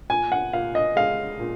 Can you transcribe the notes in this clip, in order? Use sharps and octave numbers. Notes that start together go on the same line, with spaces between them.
A#2 G#5
F#5
A#2 F5
D#5
G#3 F5
A#2